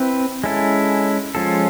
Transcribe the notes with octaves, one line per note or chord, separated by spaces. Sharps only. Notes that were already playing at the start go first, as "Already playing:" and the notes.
Already playing: C4 E4 B4
G#3 C#4 E4 A4
F3 G#3 C#4 F4 A4